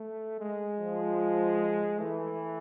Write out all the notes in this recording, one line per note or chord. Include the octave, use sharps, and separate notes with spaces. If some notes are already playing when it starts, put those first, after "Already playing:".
Already playing: A3
G#3
F3
E3 A3